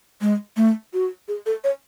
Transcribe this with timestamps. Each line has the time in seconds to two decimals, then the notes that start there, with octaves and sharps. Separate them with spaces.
0.21 G#3
0.57 A3
0.93 F#4
1.28 G#4
1.46 A4
1.64 C#5